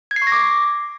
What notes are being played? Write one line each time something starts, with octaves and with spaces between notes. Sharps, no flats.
G#6
C7
C#6
A#6
D6